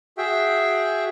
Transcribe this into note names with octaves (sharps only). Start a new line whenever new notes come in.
F#4 G#4 E5 G5